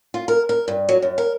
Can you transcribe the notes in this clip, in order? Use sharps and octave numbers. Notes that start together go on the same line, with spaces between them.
F4
A#4
A#4
G2
F#3
F#2
A#4